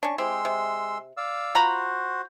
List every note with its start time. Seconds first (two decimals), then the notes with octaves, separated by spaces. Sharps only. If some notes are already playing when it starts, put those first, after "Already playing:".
0.03 C#4 D4 C#6
0.18 G#3 C4 E4 G4 C6 E6
0.45 C3
1.17 D5 F5 E6
1.55 F4 F#4 C5 A#5 B5